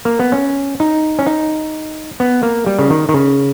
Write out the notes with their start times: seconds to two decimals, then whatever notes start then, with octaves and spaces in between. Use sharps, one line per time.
0.05 A#3
0.20 B3
0.32 C#4
0.80 D#4
1.19 C#4
1.26 D#4
2.20 B3
2.43 A#3
2.66 G3
2.79 C#3
2.90 D#3
3.09 D#3
3.14 C#3